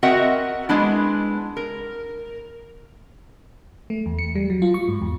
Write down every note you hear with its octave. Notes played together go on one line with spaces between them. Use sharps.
C4 F#4 A#4 D#5 E5 F#5
G#3 B3 D4 E4
A#4
A3
E2
C#7
G3
F#3
F4
C#6
G#2
E2